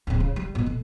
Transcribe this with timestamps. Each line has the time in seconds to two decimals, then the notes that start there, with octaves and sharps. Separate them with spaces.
0.07 D1 C3
0.20 C#3
0.36 G3
0.55 B2 B3
0.66 A3